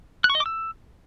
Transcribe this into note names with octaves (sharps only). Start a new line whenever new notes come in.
F#6
C#6
D#5
D6
E6